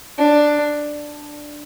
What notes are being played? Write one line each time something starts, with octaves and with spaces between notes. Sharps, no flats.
D4